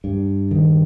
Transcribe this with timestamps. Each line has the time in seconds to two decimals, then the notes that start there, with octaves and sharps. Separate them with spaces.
0.04 G2
0.51 D#3